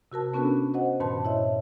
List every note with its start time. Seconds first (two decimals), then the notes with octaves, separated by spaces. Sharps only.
0.12 C3 F#4 A#4 A5
0.34 B3 C#4 D4 F#4 A4 B4
0.74 F#4 C5 D#5 F#5
1.00 G2 A#2 D#3 B4 A5 C6
1.25 E4 C#5 D#5 E5